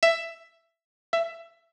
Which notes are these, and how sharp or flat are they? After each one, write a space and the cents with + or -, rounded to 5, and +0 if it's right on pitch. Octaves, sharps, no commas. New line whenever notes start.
E5 +10
E5 +20